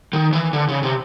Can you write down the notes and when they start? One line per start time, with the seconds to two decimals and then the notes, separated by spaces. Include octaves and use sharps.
0.13 D#3
0.33 E3
0.53 D3
0.68 C#3
0.83 C3